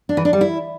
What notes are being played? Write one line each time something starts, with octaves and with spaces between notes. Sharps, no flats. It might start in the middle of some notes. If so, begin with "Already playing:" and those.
D4
E3
D4
G3
E4